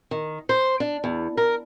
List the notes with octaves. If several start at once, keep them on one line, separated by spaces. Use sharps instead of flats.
D#3
C5
D4
E2
A#4